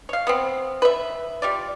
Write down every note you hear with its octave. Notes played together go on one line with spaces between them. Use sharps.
C#5 F5
B3 C4
B4 E5
G3 F4 D5